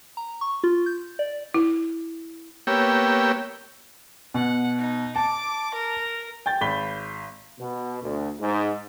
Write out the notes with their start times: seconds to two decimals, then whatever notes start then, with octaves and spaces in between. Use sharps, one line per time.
0.17 A#5
0.41 C#6
0.64 F4
0.86 G6
1.19 D5
1.54 E4
2.67 A#3 B3 G4 C#5 G5 E6
4.34 B2 F#5
4.78 D#4
5.16 A5 D6
5.74 A#4
6.46 G5 G6 A6
6.61 G#1 B5 B6 G7
7.59 B2
8.03 D2
8.41 G#2